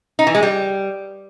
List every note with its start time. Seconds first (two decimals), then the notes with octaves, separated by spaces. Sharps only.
0.19 D#4
0.27 E3
0.35 G#3
0.43 G3